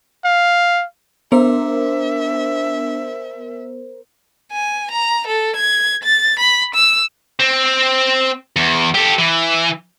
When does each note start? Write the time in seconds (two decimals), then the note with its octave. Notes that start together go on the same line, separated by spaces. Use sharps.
0.25 F5
1.32 B3 D4 A#4 C5 E5
4.52 G#5
4.91 A#5
5.27 A4
5.56 G#6
6.04 A6
6.39 B5
6.75 E6
7.40 C4
8.56 E2
8.95 G4 A4
9.19 E3